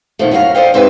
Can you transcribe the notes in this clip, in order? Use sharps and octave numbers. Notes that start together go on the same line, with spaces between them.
B2 D#3 F3 A3
F#2 A2 F#4 F5 A#5
A4 C5 D5 D#5 F5 G5
G#2 C4 G4 B4 E5 G#5